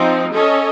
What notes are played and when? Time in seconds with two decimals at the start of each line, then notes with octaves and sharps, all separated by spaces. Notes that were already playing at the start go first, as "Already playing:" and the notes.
Already playing: F3 C4 D#4
0.34 C#4 A4 D#5